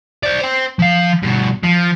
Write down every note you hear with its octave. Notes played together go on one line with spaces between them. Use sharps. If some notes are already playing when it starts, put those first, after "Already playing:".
C5 D5
C5 G5
F3 F5
G2 B2
F3